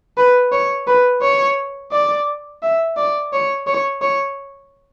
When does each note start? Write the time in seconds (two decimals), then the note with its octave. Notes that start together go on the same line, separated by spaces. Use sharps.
0.17 B4
0.52 C#5
0.87 B4
1.22 C#5
1.92 D5
2.63 E5
2.97 D5
3.33 C#5
3.67 C#5
4.02 C#5